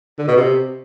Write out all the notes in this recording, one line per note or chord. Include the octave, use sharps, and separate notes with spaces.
D3
B2
C3